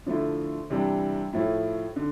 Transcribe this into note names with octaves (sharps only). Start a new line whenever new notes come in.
D3 F3 A3 E4
C3 E3 G3 D4
A2 F3 A3 E4
D3